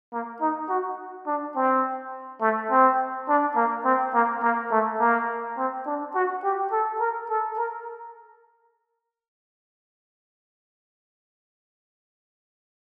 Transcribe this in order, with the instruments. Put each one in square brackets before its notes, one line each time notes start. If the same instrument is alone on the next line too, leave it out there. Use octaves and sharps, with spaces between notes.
[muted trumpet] A#3
D#4
F#4
D4
C4
A3
C4
D4
A#3
C4
A#3
A#3
A3
A#3
C4
D4
F#4
G4
A4
A#4
A4
A#4